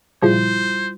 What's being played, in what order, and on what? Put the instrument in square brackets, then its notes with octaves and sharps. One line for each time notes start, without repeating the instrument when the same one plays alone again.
[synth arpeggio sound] A#2 C#3 F3 [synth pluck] G3 E4 F4 [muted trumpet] C5